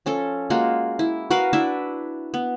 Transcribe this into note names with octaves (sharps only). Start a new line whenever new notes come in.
F3 C#4 A4
G#3 A#3 F4 F#4
E4
F#4 A#4 B4 F5
D4 E4 B4 E5
B3